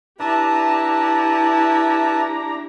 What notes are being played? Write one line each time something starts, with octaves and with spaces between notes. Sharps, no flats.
D4 E4 G4 B4 E5 A5 A#5